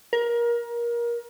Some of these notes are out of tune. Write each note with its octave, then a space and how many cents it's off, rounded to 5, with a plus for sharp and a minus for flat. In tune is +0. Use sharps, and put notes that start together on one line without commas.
A#4 +25